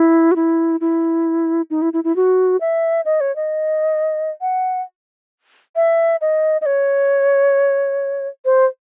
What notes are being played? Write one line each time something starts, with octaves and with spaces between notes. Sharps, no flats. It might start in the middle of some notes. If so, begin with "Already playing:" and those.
Already playing: E4
F#4
E4
E4
D#4
E4
E4
E4
F#4
E5
D#5
C#5
D#5
F#5
E5
D#5
D#5
C#5
C5